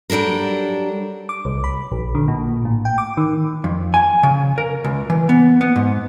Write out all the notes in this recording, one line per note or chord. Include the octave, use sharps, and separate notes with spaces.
F#3 G3 D4 A4 A#4
D6
C2
B5
A#1
D3
A#2
A2
G5
D6
D#3
F2
G#5
C#3
A#4
C#2
E3
B3
B3
G#2